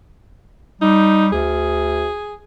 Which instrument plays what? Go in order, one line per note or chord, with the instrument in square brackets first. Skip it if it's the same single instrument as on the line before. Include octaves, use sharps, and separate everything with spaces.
[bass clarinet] G3 [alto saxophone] D#4
[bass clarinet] D2 [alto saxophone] G#4